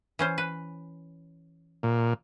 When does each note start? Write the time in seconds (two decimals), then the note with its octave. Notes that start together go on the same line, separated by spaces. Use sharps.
0.19 E3 C#4 C5
0.38 B4
1.83 A#2